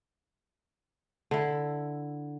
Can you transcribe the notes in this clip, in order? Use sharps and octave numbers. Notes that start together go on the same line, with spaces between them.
D3 E4